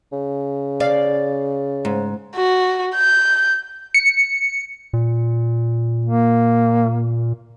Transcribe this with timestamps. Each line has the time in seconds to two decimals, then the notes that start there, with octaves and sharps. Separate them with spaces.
0.12 C#3
0.80 D5 F5
1.85 G#2
2.35 F#4
2.96 G6
3.94 C#7
4.93 A#2
6.05 A#3